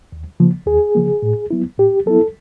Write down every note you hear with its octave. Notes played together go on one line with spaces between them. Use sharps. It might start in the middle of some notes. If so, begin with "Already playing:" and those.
D#2
C#3 F3 A#3
D#2 G#4
C#3 F3 A#3
A2
F#3 B3 E4
A2 G4
F#3 B3 E4 A4